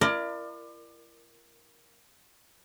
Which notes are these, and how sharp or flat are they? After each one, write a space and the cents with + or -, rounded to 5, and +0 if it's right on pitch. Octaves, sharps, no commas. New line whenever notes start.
E4 +45 A#4 +10 D5 +25